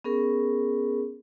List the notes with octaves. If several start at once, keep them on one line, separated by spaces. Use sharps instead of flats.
B3 C#4 G#4 A#4